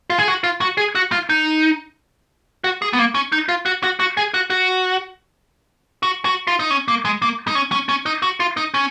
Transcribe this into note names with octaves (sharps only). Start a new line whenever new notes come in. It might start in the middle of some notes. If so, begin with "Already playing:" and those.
F4
G#4
F#4
F4
F#4
G#4
F#4
F4
D#4
F#4
G#4
B3
A#3
C#4
D#4
F4
F#4
F#4
F#4
G#4
F#4
F#4
F#4
F#4
F4
D#4
C#4
A#3
G#3
A#3
D#4
C#4
C#4
C#4
D#4
F#4
F4
D#4
C#4